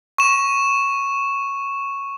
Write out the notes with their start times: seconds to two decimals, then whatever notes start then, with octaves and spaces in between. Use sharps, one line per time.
0.18 C#6 E7